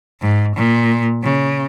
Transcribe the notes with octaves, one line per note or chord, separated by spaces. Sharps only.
G#2
A#2
C#3